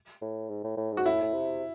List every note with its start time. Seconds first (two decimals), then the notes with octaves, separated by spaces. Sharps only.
0.22 A2
0.49 G#2
0.64 A2
0.77 A2
0.92 G#2
0.97 F#4
1.05 A2 E4
1.22 A2
1.33 C3